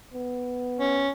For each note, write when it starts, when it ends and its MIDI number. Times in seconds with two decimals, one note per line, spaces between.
0.14 1.07 59
0.80 1.09 61